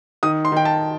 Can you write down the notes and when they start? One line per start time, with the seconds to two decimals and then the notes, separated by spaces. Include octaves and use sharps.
0.23 D#3 D#6
0.45 C6
0.52 D#3 G5
0.65 A5